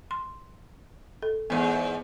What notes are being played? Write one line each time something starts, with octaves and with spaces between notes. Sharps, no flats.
C6
A4
E2 G#2 B3